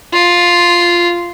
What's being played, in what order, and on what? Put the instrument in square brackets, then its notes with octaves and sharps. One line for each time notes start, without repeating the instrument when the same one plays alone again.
[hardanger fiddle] F4